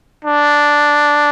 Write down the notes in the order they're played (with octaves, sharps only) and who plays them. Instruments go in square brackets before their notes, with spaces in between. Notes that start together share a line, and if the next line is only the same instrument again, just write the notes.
[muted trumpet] D4